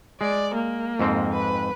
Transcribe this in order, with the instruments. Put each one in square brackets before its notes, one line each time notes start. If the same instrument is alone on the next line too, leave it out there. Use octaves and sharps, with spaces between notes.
[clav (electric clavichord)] G#3 [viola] D5
[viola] A#3
[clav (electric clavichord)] F2 G#2 C4
[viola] B4